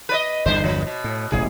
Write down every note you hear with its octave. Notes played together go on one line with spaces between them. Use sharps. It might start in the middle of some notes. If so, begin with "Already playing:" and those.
B4 D5 D#5
G1 E2 D3 C5
F3
B2
A2
E1 A1 C3 G#4